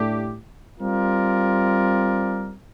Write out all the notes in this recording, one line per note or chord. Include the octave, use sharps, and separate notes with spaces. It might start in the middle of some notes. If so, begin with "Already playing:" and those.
Already playing: A2 A3 D4 G4
G3 C4 F4 A#4 D5